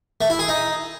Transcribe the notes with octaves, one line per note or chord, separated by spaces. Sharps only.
A3
E4
G#4
D#4